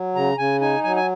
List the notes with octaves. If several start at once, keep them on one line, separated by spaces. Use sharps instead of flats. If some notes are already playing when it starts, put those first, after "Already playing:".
Already playing: F#3
C#3 A#5
C#3 G#5
D#4 G#5
F#3 G#5
G#5